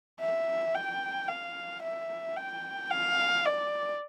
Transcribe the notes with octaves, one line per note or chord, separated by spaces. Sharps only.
E5
G5
F5
E5
G5
F5
D5